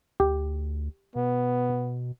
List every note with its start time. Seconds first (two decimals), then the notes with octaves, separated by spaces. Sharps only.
0.20 D2 G4
1.15 B2 B3